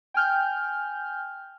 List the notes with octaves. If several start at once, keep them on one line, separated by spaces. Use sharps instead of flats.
G5 G#5 F6 G6